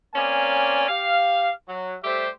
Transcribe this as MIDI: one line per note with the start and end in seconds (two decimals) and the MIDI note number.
0.15 0.87 58
0.15 0.87 60
0.15 0.87 61
0.15 0.87 74
0.15 0.87 80
0.89 1.50 67
0.89 1.50 77
1.69 1.96 54
2.04 2.28 55
2.04 2.28 57
2.04 2.28 67
2.04 2.28 72
2.04 2.28 76